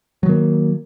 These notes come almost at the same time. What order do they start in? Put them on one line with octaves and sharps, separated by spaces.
F#3 D#3 A#3